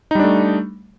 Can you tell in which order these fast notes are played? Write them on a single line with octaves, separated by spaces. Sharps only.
D#4 G3 D4 A3